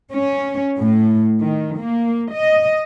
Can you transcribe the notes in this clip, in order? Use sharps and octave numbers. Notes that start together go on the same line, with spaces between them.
C#4
A2
D#3
A#3
D#5